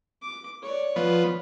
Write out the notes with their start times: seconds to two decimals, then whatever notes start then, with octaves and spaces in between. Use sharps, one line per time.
0.22 D6
0.63 C#5 D5
0.96 F3 B3